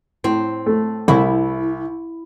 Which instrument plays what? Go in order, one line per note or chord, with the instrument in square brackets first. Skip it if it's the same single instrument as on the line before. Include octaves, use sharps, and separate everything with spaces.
[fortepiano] A2 [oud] C4
[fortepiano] A3
[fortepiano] C2 [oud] E4